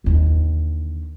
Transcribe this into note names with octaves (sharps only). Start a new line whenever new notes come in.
D#2 D3